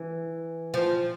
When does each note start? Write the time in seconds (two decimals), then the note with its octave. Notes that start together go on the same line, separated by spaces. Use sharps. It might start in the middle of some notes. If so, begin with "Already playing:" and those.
Already playing: E3
0.74 F3